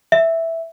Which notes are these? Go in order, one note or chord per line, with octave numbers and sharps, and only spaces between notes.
E5